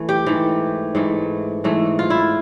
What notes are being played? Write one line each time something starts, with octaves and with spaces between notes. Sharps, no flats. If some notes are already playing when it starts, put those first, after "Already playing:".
Already playing: E3 A3
G4
G#2 E3 A3
G#2 E3 A3
G#2 E3 A3
F4
E4